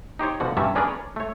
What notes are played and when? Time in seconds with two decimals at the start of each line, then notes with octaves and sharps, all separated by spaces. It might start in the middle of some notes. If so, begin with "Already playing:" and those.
0.19 D#4 G4 C5 C#5
0.40 B2 D3 F3 F#4 F#5
0.57 G2 F#3 G3 C#4 E5 A5
0.75 C#4 D4 G#4 A#4 B4 D5
0.88 C#5
1.16 A3 C#5